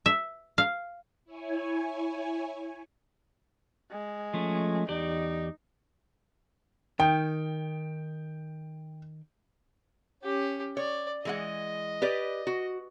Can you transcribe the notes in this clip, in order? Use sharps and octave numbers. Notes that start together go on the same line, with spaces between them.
E5
F5
E4 C#5 G#5
G#3
F3 A3 C#4
E2 D#4 G4 D5
D#3 G5
C#4 G4
C#5 D5
E3 G#3 D#5 F#5
G4 B4 D5
F#4